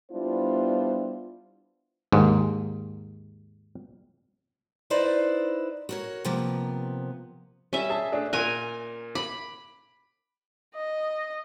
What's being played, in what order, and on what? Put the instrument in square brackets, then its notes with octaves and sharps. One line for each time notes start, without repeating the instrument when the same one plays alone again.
[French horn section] G3 B3 D4 E4 F4 C5
[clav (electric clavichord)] D#2 G#2
[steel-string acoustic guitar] D#4 E4 B4 C5 D5 D#5
F#4 A#4 C#5
C3 F3 A#3 B3
[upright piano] G3 [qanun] C#4 E5
[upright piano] G#4 A5
A3 D4 G#4
[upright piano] A#2 F#6 [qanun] A#4 G#5
[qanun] B5 [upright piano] D6
[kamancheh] D#5